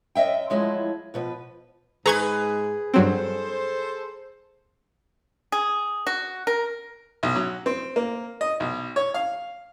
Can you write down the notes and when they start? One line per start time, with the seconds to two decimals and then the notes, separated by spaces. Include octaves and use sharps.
0.15 F#2 D#5 E5 G5
0.50 F3 F#3 G#3 A3 E4
1.14 B2 F3 B4
2.06 G#2 G#4 B4 A#5 C#6 G#6
2.94 G2 F#3 C4 A4 C5
5.52 G#4
6.07 F#4
6.47 A#4
7.23 B1
7.35 F#3
7.66 C4
7.96 A#3
8.41 D#5
8.60 B1
8.96 C#5
9.14 F5